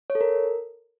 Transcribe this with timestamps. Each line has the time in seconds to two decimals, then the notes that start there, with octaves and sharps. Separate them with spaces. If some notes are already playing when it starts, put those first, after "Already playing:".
0.10 C#5
0.15 A4
0.21 A#4